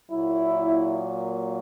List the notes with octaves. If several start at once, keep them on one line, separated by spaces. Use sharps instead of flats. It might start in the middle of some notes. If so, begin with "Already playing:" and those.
A#2 F#3 A#3 E4